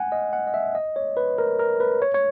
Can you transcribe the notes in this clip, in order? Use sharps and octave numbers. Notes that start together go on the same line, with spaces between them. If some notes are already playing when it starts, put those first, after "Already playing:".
Already playing: F#5 G#5
D#5
F#5
D#5
E5
D#5
C#5
B4
A#4
A#4
B4
C#5
C#5